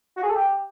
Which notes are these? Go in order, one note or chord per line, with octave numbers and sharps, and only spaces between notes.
F#4
G#4
A4
G4